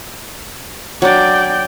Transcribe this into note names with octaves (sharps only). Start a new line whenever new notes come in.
F#3 D4 D5 G5